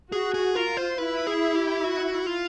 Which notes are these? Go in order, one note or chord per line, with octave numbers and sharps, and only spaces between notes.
F#4 G#4
G#4
F4 A#4
C5
E4 B4
G#4
G4
F#4
F4